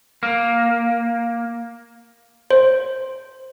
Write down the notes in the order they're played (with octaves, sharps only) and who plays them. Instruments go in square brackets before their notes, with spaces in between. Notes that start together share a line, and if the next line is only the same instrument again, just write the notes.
[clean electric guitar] A#3
[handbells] C5